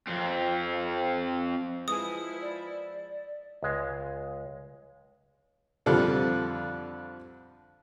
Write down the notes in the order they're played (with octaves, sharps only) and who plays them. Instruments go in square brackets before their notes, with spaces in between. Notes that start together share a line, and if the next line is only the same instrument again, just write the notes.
[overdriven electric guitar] F2 C4
[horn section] F3 E4 [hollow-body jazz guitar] G#3 G#4 [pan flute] B4 [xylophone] D#6
[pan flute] D5
[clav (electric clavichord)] C#2 G#3
[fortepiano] F2 D3 F3 G3 A4